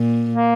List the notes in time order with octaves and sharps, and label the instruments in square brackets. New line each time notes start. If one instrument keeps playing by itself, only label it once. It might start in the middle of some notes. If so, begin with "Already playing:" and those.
Already playing: [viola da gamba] A#2
[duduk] A#3